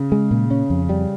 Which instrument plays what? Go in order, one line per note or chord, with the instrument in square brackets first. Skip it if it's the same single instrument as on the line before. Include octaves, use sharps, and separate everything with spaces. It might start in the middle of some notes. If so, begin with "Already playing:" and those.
Already playing: [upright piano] C#3
[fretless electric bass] G#3
A#2
C#4
F2
G3